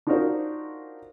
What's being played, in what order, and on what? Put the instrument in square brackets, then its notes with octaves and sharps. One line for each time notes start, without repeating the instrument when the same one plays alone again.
[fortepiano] D4 D#4 F4 F#4 A#4 C5